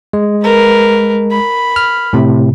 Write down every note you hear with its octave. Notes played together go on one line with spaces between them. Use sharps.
G#3
A#4 B4
B5
F6
A2 C3